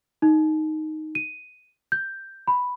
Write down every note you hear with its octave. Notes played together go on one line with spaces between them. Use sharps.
D#4
D#7
G6
B5